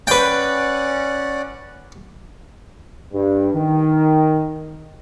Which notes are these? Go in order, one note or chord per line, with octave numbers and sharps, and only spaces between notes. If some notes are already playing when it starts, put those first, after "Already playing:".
C#4 B4 D5 F#5 G5
G2
D#3